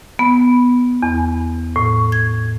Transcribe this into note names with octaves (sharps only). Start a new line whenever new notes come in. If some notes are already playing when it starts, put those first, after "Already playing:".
B3
E2
A2
G#6